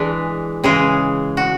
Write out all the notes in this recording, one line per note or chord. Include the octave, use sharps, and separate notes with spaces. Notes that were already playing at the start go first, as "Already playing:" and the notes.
Already playing: E3 G#3 D4 B4
C#3 E3 G#3 G#4
F#4